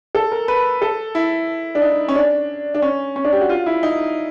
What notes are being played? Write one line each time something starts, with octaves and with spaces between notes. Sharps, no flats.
A4
A#4
B4
A4
E4
D4
D#4
C#4
D4
D4
C#4
C#4
D4
G4
F#4
F4
E4
D#4